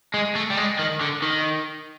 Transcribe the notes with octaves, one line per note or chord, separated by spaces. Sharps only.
G#3
A3
G3
G#3
D#3
D3
D#3